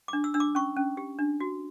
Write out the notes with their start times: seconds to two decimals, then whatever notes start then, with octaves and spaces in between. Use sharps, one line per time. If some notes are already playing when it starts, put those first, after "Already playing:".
0.08 D4 D6
0.24 E6
0.34 D4 E6
0.40 D6
0.55 C#4 C#6
0.76 C#4
0.97 G4
1.19 D4
1.40 F#4